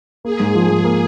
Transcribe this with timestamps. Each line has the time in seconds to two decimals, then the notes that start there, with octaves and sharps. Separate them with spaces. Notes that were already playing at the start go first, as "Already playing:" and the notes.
0.24 A#3 G#4
0.40 G#2
0.55 F3
0.70 G#2
0.84 A#3